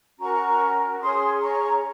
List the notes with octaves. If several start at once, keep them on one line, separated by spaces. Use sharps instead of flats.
C#4 F#4 A#4 A#5 C#6
C#4 G#4 C#5 C6 D#6
A#5 C#6